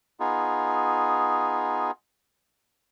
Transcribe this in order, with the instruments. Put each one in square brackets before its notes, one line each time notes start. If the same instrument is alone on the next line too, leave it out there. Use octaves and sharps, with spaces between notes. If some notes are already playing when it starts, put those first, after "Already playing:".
[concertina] B3 D#4 F4 G#4